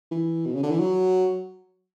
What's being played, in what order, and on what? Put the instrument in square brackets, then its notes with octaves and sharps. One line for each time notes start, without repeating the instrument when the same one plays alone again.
[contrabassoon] E3
B2
C#3
D3
E3
F#3